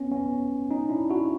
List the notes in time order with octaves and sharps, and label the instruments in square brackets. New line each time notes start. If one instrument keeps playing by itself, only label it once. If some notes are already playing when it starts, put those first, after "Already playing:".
Already playing: [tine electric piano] B3 C#4
B3 C#4
C#4 D#4
D4 E4
E4 F#4